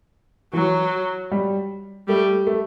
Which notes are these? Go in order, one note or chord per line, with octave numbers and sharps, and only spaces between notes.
E3 F#3
G3
G3 A3
A3